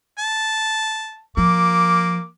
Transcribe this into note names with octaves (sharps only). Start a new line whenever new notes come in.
A5
F3 A#3 D6